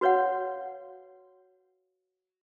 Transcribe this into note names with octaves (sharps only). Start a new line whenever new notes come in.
F#4 B4 C#5 F5 F#5